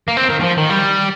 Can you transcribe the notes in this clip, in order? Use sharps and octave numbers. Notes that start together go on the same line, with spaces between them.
A#3
C4
D#3
D#3
F3
D#3
G3